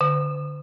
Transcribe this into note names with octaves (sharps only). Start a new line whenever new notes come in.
D3